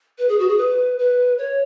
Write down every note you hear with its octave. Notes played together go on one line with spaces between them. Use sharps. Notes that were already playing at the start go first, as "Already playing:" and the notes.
B4
G#4
F#4
G#4
B4
B4
C#5